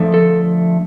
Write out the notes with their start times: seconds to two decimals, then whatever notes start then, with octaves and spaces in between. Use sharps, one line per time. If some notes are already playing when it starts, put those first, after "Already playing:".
Already playing: D3 F3 A3
0.14 A4